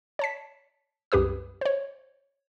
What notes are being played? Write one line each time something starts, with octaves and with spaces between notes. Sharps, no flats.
C#5 A5 B6
C2 F#2 G4 B4 D#6
C5 C#5